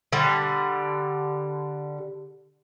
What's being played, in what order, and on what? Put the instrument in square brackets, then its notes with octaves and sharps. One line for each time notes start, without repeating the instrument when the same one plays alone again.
[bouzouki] D3 G3